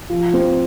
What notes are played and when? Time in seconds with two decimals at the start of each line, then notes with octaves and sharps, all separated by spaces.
0.10 F3
0.34 C4